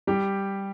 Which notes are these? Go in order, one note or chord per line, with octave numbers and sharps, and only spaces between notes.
G3 G4